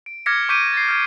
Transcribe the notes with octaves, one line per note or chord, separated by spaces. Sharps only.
D7
D6 F6 G#6 A#6 B6 C#7
C#6 D6 G6 B6 D7 D#7
A6 C7
F6 G#6